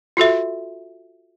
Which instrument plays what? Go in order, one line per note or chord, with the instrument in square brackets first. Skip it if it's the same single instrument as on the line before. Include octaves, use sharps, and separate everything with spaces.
[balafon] F4 F#4 A4 E5